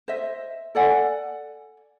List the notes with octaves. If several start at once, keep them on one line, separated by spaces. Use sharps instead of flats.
C5 D#5 E5
A4 D5 F#5 G#5